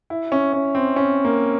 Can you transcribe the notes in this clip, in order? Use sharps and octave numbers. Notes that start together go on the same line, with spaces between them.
E4
C#4
C#4
C4
C#4
A#3